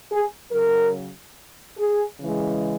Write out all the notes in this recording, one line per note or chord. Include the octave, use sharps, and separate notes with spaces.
G#4
C#3 F#3 A#4
G#4
C#3 E3 G#3